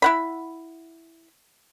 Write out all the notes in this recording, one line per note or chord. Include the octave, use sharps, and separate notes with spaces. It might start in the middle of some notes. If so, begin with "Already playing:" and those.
E4 F#5 B5